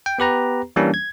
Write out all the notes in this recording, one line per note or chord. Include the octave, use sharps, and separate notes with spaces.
G5
B3 G4 B4 A#5
E3 G3 A#3 C#4 D4
G#6